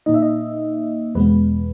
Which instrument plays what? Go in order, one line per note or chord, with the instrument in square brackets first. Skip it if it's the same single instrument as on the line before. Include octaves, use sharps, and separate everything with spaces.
[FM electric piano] A#2 A#3 D#4 D#5
E5
D#5
E2 B2 G#3 B3 B4